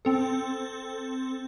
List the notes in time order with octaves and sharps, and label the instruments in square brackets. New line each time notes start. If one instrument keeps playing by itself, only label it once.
[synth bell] C4 A4